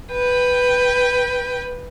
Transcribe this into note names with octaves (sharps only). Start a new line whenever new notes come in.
B4 G5